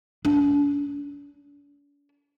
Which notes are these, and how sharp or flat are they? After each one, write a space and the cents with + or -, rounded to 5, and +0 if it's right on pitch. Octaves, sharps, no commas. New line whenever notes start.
D4 -45